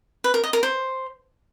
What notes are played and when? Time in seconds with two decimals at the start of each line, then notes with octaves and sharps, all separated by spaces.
0.24 B4
0.34 A#4
0.44 D#5
0.53 A#4
0.63 C5